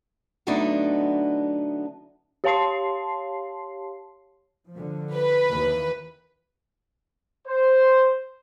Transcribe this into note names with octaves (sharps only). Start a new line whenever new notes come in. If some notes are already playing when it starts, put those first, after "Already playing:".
D3 F#3 A3 B3 D4 D#4
G4 C#5 F5 A5 C6 C7
D3 F3
B4
D#2 E3
C5